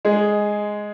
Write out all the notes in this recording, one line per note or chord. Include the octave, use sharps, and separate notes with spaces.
G#3 G#4